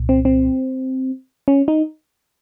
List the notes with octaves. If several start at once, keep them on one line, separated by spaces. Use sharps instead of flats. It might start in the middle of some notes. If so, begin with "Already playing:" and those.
Already playing: C2 A#2
C4
C4
C#4
D#4